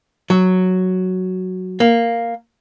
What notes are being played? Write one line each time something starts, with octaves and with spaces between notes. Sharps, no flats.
F#3
A#3